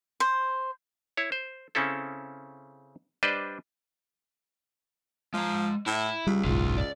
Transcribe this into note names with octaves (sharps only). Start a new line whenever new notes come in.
C5
E4 C#5
C5
C#3 C4 C#4 E4 A4
G3 D4 B4 C5 D5 D#5
F3 G#3 A#5
A2 E4
C#2 G3
F#1 B1 G#2 F4 F#4
D5